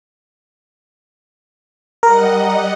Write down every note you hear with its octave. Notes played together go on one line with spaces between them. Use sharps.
G3 A#4 D#5 F#5